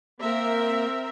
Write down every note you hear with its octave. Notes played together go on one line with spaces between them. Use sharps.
A#3 C4 A#4 E5